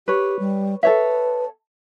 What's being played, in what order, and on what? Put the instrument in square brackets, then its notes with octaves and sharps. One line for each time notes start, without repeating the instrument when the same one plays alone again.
[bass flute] G4 [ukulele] B4 C#5
[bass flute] G3
[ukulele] A4 C#5 E5 [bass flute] B4